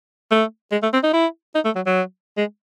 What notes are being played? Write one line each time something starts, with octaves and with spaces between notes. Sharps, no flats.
A3
G#3
A3
C4
D#4
E4
D#4
A3
F#3
F#3
G#3